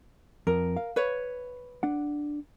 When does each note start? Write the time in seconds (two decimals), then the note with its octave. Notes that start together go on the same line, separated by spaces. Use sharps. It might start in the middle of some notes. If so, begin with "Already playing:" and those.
0.47 F2 A#4
0.77 F5
0.96 B4 C#5
1.83 D4 F#5